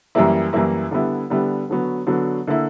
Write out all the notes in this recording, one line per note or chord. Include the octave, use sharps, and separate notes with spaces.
F#2 E3 G3 A#3 E4
F#2 E3 G3 A#3 E4
D3 G3 B3 E4
D3 G3 B3 E4
D3 F#3 B3 F#4
D3 F#3 B3 F#4
D3 A#3 E4